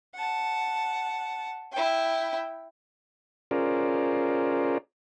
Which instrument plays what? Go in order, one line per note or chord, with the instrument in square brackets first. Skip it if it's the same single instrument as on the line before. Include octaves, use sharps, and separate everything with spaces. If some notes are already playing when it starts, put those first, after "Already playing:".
[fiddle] F#5 A5
E4 G5
[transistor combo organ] C#4 F4 G#4 A#4 C5 D5